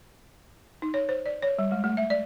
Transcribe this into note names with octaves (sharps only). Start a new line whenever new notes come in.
D#4
C#5
C5
D5
C#5
G3
G#3
A3
E5
D5